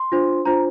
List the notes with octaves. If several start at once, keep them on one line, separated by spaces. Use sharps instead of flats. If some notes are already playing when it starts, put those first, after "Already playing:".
Already playing: C6
D4 F4 C5
D4 F4 C5 A#5